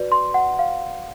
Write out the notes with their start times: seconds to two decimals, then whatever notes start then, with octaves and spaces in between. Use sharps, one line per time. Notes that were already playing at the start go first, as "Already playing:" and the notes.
Already playing: F#4 B4 D5
0.12 C6
0.34 F#5
0.59 F5